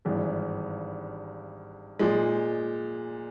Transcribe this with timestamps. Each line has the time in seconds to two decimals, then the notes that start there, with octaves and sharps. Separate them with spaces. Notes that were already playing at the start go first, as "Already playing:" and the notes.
0.05 G#1 G2 E3 G#3
1.99 A#2 F3 G#3